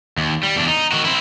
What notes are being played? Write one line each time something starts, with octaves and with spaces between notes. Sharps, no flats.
D#2
G3
E2 D4
D#4
D#3 F#4
C4 E4